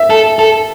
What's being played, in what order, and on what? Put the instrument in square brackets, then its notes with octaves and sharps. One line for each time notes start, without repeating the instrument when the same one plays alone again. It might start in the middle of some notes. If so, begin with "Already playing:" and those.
Already playing: [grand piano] E5
[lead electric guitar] A4
A4